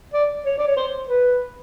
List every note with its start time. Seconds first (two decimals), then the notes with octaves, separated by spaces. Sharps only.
0.14 D5
0.46 C#5
0.58 D5
0.67 C#5
0.77 C5
1.09 B4